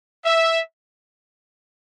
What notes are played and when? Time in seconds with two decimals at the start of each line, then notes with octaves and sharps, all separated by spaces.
0.25 E5